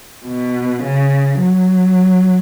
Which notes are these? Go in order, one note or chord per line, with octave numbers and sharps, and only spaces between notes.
B2
C#3
F#3